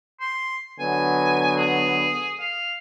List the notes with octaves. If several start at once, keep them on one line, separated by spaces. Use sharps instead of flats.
C6
D3 F#3 B3 G#5
G#4
F5